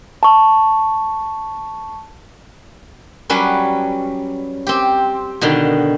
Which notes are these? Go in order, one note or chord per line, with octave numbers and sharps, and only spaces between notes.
A5 C#6
F#3 G3 C#4 B4
C4 G4
B2 D3 D#3